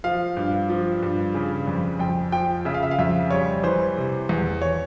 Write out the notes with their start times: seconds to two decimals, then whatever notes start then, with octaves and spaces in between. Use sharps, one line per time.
0.04 F3 F5
0.37 G2
0.69 F3
1.03 G2
1.34 C#3
1.68 F2
2.00 F2 G5
2.32 F3 G5
2.65 C#3 E5
2.74 F5
2.83 E5
2.91 F5
2.99 F2 E5
3.31 G3 C#5
3.63 E3 C5
3.97 C3
4.29 E2
4.62 C#5